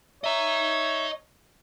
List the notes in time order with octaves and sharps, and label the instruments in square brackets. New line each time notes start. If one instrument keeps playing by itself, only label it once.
[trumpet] C#5 [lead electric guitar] D#5 A#5 [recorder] E5